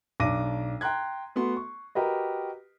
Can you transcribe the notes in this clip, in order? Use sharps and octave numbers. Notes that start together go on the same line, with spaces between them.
B1 D4 D6 A#6 D#7
G5 A#5 C6 F#6 G#6
A3 B3 F#4 C6
C#6
F#4 G4 A#4 B4 D#5